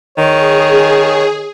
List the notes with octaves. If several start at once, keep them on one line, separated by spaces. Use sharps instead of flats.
D#3 G#4 C#5